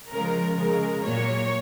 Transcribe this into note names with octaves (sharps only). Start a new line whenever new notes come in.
C#3 F3 G#3 A#4
C#3 G#3 A#4
A#2 F#3 A#3 C#5